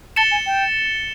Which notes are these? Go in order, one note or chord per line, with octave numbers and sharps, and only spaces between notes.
A5 A6 C#7 E7 G7
G#5
G5